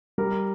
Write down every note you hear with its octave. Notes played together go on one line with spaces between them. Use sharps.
G3 A#4